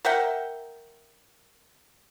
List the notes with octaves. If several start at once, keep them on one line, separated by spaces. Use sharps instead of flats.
A#4 E5 F#5 G5